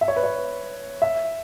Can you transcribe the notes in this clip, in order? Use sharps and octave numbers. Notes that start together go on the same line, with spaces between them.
E5
C#5
B4
C#5
E5